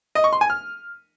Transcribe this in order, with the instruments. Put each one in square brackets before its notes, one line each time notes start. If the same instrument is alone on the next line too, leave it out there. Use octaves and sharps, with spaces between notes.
[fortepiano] D#5
C#6
C6
G#5
F6